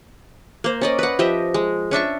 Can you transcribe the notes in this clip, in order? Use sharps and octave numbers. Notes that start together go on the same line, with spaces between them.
A#3 C5
C#4 D5 D#5
B4 F#5
F3 G4 D#5 E5
G#3
C#4 D4 E5 C#6